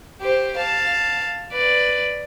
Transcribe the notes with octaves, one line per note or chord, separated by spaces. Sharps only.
G4 C5
F5 A5
B4 D5